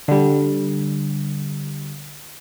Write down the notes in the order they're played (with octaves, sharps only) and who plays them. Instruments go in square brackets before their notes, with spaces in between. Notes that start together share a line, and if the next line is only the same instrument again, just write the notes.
[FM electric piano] D3 G3